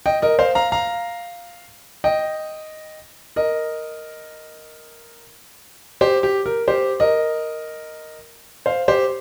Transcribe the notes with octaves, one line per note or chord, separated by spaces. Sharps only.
D#5 G5
A#4 D#5
C5 F5
F5 A#5
F5 A#5
D#5 G5
A#4 D#5
G4 C5
G4
A#4
G4 C5
A#4 D#5
C5 F5
G4 C5